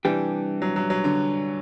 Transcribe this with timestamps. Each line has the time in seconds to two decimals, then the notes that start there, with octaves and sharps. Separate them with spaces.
0.05 C3 E3 G3 D4 G4
0.62 F#3
0.76 F#3
0.90 F#3
1.04 D3